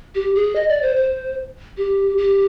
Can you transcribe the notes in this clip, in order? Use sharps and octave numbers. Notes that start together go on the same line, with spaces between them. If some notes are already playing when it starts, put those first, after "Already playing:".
G4
G#4
D#5
D5
C5
C5
G4
G4